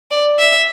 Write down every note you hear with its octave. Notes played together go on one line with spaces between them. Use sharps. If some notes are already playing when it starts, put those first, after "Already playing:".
D5
E5